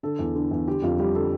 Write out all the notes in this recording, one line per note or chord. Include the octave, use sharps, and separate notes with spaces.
D3 A4
E2
D3
E2
D3 G4
F2 F4
G3 G4
D3 A4